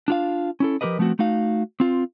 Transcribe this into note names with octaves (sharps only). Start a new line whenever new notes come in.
D4 F4 F5
C#4 E4 A4
F3 G#3 G4 A#4 B4 D#5
F3 A3 B3 C4 F#4
A3 D#4 F#4 F5
C4 F4